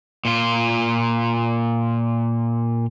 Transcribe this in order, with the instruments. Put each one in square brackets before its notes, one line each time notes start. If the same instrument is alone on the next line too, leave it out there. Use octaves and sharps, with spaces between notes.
[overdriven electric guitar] A#2 F4